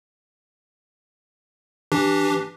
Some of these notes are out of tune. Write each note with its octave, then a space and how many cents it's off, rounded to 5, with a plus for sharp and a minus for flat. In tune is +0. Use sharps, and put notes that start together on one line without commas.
E3 +0 D4 +0 G4 +0